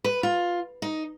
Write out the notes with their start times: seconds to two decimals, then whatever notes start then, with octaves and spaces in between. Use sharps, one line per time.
0.04 B4
0.23 F4
0.82 D#4